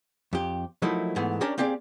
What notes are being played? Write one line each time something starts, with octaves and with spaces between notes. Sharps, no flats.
F2 G4
F3 F#3 A3 A#3 D#4 E4
G#2 E3 A3 B3
C#4 D4 G4 A#4 C#5 D5
A#3 C4 G4 G#4 D5